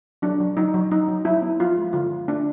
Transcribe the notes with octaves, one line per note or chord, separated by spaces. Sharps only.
F#3 D4
F#3
F#3 D#4
F#3
F#3 D#4
F#3
F#3 E4
B3
F3 F4
G#3
D3 F4
D3
A3 D4